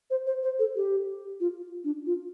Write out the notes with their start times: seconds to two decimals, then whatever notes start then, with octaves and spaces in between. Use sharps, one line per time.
0.10 C5
0.27 C5
0.43 C5
0.59 A4
0.76 G4
1.40 F4
1.84 D4
2.06 F4